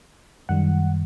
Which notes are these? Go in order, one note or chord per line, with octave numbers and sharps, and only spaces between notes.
F#2 D#3 G3 F#5